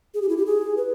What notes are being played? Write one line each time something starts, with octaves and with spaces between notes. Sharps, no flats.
G#4
G4
E4
G4
G#4
B4